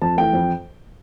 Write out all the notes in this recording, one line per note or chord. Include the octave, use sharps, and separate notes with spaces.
F2 A5
E3 A3 G5
F2